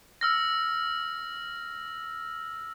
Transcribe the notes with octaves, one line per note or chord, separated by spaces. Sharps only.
E6 F6 A#6